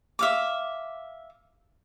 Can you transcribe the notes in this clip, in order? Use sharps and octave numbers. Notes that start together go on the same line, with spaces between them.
E5 F5 D6